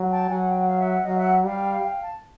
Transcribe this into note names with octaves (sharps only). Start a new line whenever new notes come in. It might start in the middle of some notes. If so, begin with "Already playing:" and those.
Already playing: F#3
G5 A5
F#3 F#5 G#5
G5
F#5
F5
E5 F#5
F#3 D#5 F5
E5 F#5
G3 F5 G5
F5 G5
A5